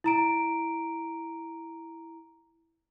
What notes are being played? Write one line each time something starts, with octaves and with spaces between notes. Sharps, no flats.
E4 A#5 D7